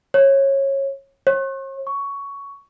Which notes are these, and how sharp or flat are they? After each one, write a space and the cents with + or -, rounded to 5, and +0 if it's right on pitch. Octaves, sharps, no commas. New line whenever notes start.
C#5 -20
C#5 -45
C#6 +10